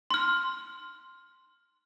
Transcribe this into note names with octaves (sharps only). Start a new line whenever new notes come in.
C6 F6